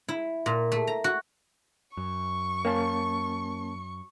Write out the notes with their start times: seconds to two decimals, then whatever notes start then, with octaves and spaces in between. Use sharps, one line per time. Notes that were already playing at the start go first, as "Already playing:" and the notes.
0.09 E4
0.46 A#2
0.72 A3
0.87 A#5
1.04 F#4
1.97 F#2 C#6
2.65 A#3 C#4 A5